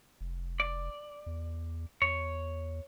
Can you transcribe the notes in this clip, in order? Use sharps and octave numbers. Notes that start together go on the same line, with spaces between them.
F1
D5
E2
E2 C#5